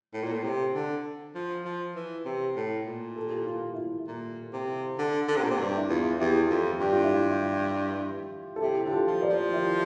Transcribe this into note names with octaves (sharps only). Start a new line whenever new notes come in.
A2
A#2
A2
C3
D3
F3
F3
E3
C3
A2
A#2
A4
G4
F4 A4
F4
E4
F4
A#2
C3
D3
D3
C3
A#2
C3
G2
E4
E2 F4
E2 E4 G4
F2 F4
G2 G4
F4
E4
F4
A4
C3 E4 G4
D3 G4
F4 A4
F3
A#4 D5
F3
E4 G4